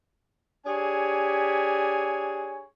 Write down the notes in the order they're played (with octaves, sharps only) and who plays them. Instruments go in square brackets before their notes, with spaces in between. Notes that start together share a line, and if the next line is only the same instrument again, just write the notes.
[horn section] D4 G4 G#4 C#5 G#5